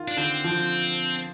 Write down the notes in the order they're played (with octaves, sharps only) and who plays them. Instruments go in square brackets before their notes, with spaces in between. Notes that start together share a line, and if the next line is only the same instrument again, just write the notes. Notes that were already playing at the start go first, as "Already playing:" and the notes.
Already playing: [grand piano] D#3 F4
[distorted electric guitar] D4
[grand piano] D3 [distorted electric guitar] C4
[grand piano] F3